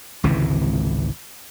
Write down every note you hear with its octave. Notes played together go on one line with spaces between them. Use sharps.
G#1 C#2 C3 E3